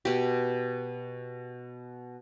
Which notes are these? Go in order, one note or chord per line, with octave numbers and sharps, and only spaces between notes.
B2 G4